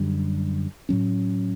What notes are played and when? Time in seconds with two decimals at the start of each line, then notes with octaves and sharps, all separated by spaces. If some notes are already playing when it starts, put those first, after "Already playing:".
Already playing: F#2 D3 G3
0.89 A2 F#3 C#4